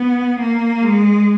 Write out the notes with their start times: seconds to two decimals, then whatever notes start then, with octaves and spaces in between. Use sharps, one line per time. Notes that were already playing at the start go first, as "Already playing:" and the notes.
Already playing: B3
0.40 A#3
0.82 G#3